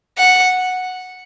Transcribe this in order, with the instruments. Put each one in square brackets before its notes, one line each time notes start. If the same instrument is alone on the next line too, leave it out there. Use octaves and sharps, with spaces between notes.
[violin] F#5